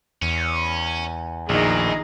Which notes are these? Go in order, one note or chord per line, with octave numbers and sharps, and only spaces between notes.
E2 C#4
A#1 A2 D#3 D#4 G#4